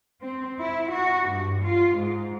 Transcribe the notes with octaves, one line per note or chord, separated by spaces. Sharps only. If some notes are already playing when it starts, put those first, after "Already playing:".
C4
E4
F#4
G2
F4
G#2